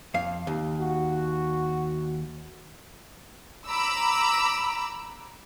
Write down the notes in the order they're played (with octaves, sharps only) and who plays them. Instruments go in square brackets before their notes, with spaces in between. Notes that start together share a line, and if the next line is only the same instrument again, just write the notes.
[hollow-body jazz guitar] F2 F5
D#2
[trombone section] F#4
[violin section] A#5 B5 D6 E6